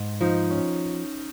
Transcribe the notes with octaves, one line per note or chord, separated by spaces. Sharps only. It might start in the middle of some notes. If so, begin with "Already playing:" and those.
Already playing: G#2
F3 D#4
C#4